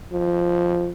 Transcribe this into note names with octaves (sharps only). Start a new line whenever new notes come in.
F3